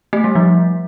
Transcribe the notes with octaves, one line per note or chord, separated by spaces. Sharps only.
A3
G3
F3